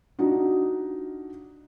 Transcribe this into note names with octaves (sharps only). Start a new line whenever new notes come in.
D4 D#4 F4 F#4